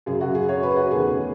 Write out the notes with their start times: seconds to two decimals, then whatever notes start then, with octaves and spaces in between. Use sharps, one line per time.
0.06 F#2 C#3 F#3 G#4
0.21 F#4
0.35 G#4
0.49 C#5
0.63 B4
0.77 F#4
0.91 E2 D#3 A3 C#4 G#4